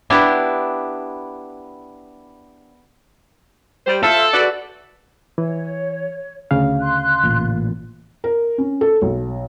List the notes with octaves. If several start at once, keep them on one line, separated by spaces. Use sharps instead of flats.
B3 D4 E4 G4
G3 C5
F4 A4 C5 E5
F#4 B4 D5
E3 C#5
D2 C#3 F5
C6 F#6
A1 A#2
A#4
C#4
A4
B1